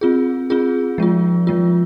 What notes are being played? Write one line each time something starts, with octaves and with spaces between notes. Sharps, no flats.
C4 F4 G#4
C4 F4 G#4
F3 G#3 F4
F3 G#3 F4